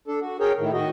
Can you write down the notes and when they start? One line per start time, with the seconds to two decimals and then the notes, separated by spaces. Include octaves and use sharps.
0.08 D4 A4
0.21 F#4
0.40 G#4 A#4 C#5 G5
0.59 A2 D#3
0.73 D#3 F#4 D#5